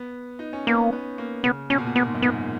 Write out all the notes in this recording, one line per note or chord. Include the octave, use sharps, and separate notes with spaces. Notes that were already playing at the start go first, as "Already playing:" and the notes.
Already playing: B3
D#4
C#4
A#3 B3
B3
A#3
C#3 B3
B2 C#4
A#2
B2
A#2 B3
G#2
F#2
G#2 B3